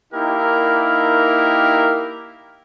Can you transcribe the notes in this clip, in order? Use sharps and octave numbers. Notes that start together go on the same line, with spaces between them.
A#3 D#4 E4 G4 A#4